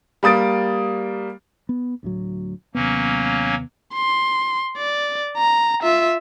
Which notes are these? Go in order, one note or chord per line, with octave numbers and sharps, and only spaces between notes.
G3 A#3 D#6 A6 D7
B3
D2 A2 F#3
D#2 C3 F#3 A#3 B3 C#4
C6
D5
A#5
F4 E5